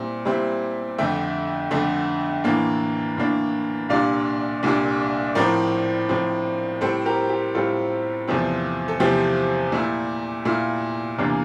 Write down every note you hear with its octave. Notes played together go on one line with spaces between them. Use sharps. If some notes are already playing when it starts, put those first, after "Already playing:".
Already playing: A#2 G3 C4 E4
A#2 G3 C4 E4
F2 D3 A3 E5 G5
F2 D3 A3
A2 E3 A#3 D4
A2 E3 A#3 D4
C2 A#2 G3 D4 D5 F5
C2 A#2 G3 D4
A2 F3 C4 A#4 D5
A2 F3 C4
A2 G3 C4 A4 C5
G4 A#4
G4
A2 G3 C4 F4 A4
E2 C3 F3 A3 C4
A4
E2 C3 F3 A3 C4 G4
A#2 A3 E4
A#2 A3 E4 F4
E2 C3 E3 A#3 D4